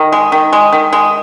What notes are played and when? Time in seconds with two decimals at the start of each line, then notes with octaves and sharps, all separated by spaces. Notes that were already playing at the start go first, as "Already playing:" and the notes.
Already playing: D#3
0.12 G#3
0.32 D#3
0.53 G#3
0.72 D#3
0.93 G#3